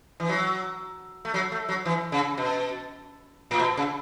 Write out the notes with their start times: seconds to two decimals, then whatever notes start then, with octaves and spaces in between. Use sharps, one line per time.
0.20 E3
0.29 F#3
1.25 A3
1.34 F#3
1.52 A3
1.69 F#3
1.85 E3
2.12 C#3
2.38 B2
3.51 A2
3.60 B2
3.77 C#3